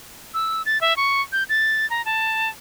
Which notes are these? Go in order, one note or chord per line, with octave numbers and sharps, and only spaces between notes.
E6
A6
E5
C#6
G6
A6
A#5
A5